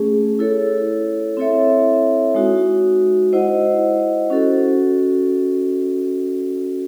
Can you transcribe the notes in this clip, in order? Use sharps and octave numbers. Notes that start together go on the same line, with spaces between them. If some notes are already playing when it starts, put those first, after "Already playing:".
Already playing: A3 C#4 G#4
E4 A4 C#5
C4 E4 A4 C#5 E5
G#3 D#4 F#4
E4 C5 D#5 F#5
C#4 F#4 A4